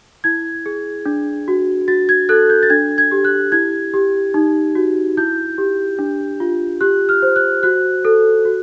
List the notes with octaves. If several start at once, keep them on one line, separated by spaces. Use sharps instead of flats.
E4 G#6
G#4
D4
F#4
F#4 A6
G#6
A4 F#6
G6
A6
D4 G#6
G#6
G4
F#6
E4 G#6
G4
D#4
F#4
E4 G6
G4
D4
F4
G4 F#6
F6
C5
F#6
F#4 F#6
A4
F#4